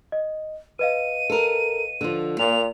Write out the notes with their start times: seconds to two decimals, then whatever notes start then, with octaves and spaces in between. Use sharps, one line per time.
0.12 D#5
0.79 B4 D#5 F5 D#7
1.30 A4 A#4
2.01 D3 F3
2.39 A#2 A#3 F7